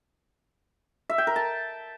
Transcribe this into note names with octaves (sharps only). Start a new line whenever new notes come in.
E5
G5
A#4
A5